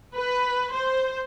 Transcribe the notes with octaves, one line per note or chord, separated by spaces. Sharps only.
B4
C5